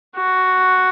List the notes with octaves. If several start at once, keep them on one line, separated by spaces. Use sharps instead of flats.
F#4